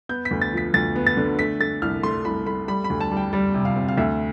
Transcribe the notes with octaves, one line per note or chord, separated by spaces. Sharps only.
B3 G6
B6
D2
A6
F3 B6
D2 A6
B3
A6
D3
A3 B6
A3 A6
C2 F6
A3 C6
C2 B5
A3 B5
G3 B5
B5
D2
A5
G3
G5
G3
C3
F5
C4
F5
D2 E5